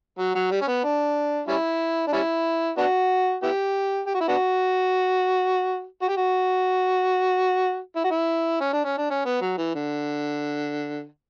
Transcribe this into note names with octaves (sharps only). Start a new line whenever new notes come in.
F#3
F#3
G3
C#4
B3
D4
G3 C#4 E4
D4
G3 C#4 E4
B3 D4 F#4
B3 E4 G4
G4
F#4
E4
B3 D4 F#4
F#4
G4
F#4
E4
F#4
E4
C#4
D4
C#4
D4
C#4
B3
F#3
E3
D3